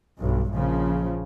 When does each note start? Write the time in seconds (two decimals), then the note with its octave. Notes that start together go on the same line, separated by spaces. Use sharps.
0.17 B1 G2
0.53 A#1 C#3 F3